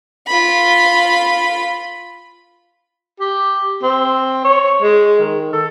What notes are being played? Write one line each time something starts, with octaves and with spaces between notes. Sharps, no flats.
F4 B5
G4
C4
C#5
G#3
D#3
A4